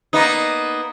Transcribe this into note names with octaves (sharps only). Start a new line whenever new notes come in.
A#3 B3 D#4